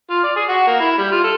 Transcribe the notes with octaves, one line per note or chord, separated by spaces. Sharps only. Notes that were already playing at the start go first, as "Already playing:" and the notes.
F4
D5
G#4
F#4
A#3
E4
G3
F4
A4